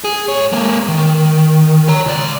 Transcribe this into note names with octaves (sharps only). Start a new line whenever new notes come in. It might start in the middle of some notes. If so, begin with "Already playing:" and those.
G#4
G#2 C#5
G#3 A#3
D#3
C#5 A#5
C#2 D5